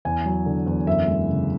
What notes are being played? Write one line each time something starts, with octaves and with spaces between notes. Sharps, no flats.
E2 G#5
F#3
D3
E2
F#2 E5
G#3
C#3